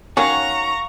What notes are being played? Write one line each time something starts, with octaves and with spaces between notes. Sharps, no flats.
D#3 F#3 C#4 F5 F#5 A#5 C#6